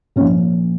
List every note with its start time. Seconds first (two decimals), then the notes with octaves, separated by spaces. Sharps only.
0.16 A#2 C#4
0.21 F3